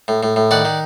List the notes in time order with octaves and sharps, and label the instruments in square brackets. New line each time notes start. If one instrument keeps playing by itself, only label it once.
[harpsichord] A2
A2
A2
D#3 D5 F#5
D#3